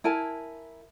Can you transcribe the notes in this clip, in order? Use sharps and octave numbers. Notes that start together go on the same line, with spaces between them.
E4 A#4 G#5 A5